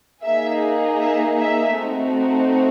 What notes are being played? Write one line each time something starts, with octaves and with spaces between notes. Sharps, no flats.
A#3 D#4 G#4 E5
E5
E5
A3 C4 D#4 F#4